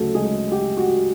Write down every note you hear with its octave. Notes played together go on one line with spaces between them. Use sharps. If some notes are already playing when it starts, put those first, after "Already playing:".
Already playing: D2 C#3 F#3 A3 A4
G#3 G#4
G4
F#4